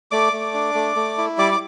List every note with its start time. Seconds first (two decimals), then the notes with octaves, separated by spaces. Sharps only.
0.11 A3 D5 D6
0.33 A3
0.54 D4
0.75 A3
0.96 A3
1.18 E4
1.38 G3 D5 D6
1.52 D6